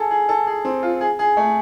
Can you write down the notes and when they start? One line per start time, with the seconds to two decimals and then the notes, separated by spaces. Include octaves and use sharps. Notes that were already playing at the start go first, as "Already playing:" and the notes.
Already playing: G#4 A4
0.11 G#4
0.29 A4
0.47 G#4
0.65 C4
0.83 F4
1.01 G#4
1.19 G#4
1.37 A3